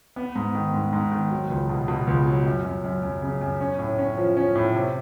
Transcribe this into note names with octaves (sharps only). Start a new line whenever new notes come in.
B3
G#2
D#3
G#2
G#2
D#3
F#3
C#2
B2
B2
C#2
F#3
F#2
F#2
F#2
F#2
C#3
F#2
C#4
A2
C#4
F3
C#4
A2
C3